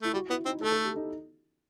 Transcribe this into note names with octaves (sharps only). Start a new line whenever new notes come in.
A3 E4
G3 F#4
B3 E4
C4 D#4
A3 A4
A4
G4
D#4